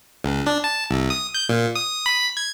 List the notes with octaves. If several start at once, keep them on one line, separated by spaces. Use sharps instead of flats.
C#2
D4
A5
C2
D#6
G6
A#2
D#6
B5
G#6